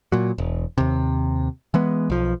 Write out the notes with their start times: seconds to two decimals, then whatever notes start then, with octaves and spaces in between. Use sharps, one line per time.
0.12 A#2 F#3
0.38 E1
0.78 D#2 C3
1.74 E3 G#3 B3
2.10 B1 F3